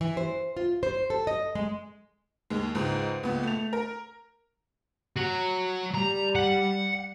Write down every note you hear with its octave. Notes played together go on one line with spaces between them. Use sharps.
E3
C5
F4
C5
A4
D#5
G#3
D#2 G#3
C#2 G#2
C#2 B3
A3 F7
A#4
F#3 F#4
G3 A#5
F#5